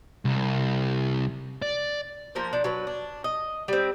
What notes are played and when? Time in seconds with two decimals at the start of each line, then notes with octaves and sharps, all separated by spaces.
0.25 C2
1.62 D5
2.35 F3 A#3 A#4 C5
2.53 F3 D4
2.64 F#3 D4 B4
2.87 D4
3.24 D#5
3.68 G3 C4